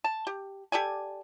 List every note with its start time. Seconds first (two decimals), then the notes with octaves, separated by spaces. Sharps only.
0.04 A5
0.27 G4
0.72 G4 A4 D5 G#5